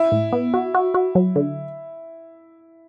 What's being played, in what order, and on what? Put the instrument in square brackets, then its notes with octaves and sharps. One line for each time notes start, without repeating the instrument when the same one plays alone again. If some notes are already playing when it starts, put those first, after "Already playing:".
Already playing: [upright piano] E4
[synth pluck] A2
B3
F#4
F#4
F#4
F#3
D3